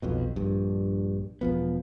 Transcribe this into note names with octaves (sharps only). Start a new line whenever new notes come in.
B1 F2 B2
A#1 G2
E1 F3 B3